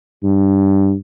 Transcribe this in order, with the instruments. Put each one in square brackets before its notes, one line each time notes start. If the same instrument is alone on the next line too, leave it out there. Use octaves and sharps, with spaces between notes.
[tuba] G2